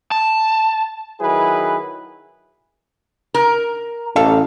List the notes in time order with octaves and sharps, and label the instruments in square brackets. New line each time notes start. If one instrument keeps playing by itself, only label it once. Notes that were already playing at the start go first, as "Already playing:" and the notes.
[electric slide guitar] A5
[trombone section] D#3 F#3 E4 G#4 B4
[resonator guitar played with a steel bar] A#4
[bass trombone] A1 [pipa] A4 F5